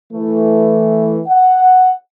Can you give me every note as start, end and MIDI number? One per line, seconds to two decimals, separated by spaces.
0.13 1.20 52
0.13 1.20 57
1.27 1.93 78